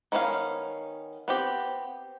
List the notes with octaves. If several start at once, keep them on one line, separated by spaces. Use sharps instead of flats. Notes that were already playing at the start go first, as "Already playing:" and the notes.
D#3 B3 C#4 D#4 F5
B3 C4 G4